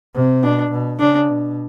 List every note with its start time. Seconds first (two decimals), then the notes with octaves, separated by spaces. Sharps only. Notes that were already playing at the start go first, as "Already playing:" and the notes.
0.15 C3
0.43 B2 D4
0.72 B2
1.00 C#3 D4
1.29 B2